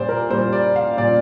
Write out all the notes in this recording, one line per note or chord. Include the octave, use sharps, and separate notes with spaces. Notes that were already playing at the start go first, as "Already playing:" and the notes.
Already playing: A#2 G3 C5 D5
A#4
A#2 G3 C5
D5
F5
A#2 G3 D5